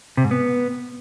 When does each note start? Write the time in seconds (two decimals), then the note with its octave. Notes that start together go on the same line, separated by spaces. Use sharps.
0.17 C3
0.24 G#2
0.31 B3